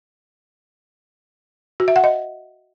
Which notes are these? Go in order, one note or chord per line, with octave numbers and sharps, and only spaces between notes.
F#4
E5
F#5
D#5